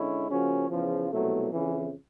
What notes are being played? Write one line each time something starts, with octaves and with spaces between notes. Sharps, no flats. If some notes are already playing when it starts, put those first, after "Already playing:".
Already playing: D3 G#3 C#4 E4
C#3 F3 A#3 C#4 F#4
E2 C#3 F3
C2 B2 F#3 A3
F2 C#3 E3